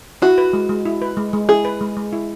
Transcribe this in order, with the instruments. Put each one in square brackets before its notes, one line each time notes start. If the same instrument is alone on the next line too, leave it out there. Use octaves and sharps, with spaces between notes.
[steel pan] E4 [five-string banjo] F#4
[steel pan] B4
G#3
G#3
E4
B4
G#3
G#3
[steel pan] E4 [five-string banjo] G#4
[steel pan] B4
G#3
G#3
E4